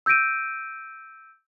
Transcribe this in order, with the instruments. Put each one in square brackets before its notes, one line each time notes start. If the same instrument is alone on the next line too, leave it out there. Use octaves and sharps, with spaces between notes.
[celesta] E6 G6 A#6 D7 D#7